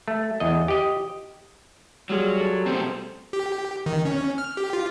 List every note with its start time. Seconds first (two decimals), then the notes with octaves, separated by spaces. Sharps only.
0.08 A3
0.40 E2 D#5
0.68 G4 D#5
2.09 F#3 G3 F4 G#4
2.41 A4
2.66 B2 A3 C4 C5
3.33 G4
3.86 D#3
4.05 C#4
4.38 F6
4.57 G4
4.73 F4